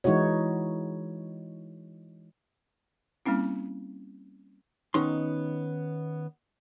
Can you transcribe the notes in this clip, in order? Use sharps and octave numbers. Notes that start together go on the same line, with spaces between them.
E3 G#3 D#4 E4 F#4 C#5
G3 A#3 C4 C#4 E4
D#3 B3 C#4 D#4 C6